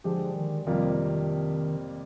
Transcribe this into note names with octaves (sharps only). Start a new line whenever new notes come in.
D3 F3 G#3 D4 G4
D#3
F2 C3 D#3 G3 A#3 F4